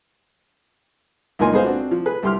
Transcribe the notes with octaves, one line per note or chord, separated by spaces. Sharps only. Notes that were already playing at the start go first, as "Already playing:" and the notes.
C#2 A#2 D#4 A#4 G#5 C6
G#3 B3 G#4 C5 F5
C4 D4 F#4
F3
G#4 B4
C2 G4 C6 F6